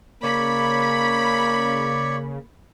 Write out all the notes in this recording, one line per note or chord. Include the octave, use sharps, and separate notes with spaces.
C#3 A#3 C#5 D5 B5 C#6